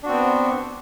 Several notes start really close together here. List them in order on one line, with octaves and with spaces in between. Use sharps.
D4 F#4 C4 B3